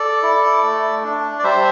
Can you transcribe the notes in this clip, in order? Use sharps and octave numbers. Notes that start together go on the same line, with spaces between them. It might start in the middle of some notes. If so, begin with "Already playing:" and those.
Already playing: A4 D5
E4
A3
D4
D5
G3 C5 E5